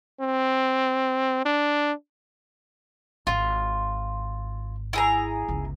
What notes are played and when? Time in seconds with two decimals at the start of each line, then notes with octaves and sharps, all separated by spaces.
0.21 C4
1.45 D4
3.27 G#1 F4
4.93 E4 G#4 A#5
5.48 G1 C#2